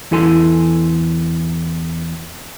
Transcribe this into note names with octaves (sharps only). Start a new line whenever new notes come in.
E2 E4 A4 G#5 C6